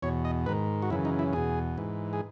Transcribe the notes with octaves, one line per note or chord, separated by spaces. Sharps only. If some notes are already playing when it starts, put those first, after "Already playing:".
E2 B2 C#5
D#5
G#2 D#3 B4
F#4
F#2 C#3 E3 E4
D#4
E4
E2 B2 G#4
G#2 E3
G#4